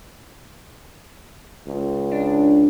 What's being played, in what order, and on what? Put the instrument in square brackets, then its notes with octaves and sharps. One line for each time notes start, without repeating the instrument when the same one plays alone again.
[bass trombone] C#2
[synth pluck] D4